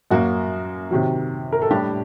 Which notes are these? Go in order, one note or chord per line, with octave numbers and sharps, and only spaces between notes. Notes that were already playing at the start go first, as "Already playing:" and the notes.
F#2 F#3 A#3 F#4
C3 D#3 F#3
A#4
A4
A2 G3 D4 G4